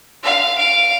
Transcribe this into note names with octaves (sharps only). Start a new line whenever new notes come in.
F5
F5 D7